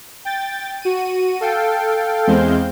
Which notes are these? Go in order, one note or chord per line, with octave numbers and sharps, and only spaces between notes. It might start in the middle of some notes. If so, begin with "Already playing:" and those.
G5 A6
F#4 D#7
A4 F5 G5
E2 G#3 C4 F5 G6